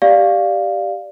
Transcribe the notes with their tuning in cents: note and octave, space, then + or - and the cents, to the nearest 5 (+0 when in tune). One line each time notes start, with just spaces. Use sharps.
G4 +0 D5 +0 F5 +0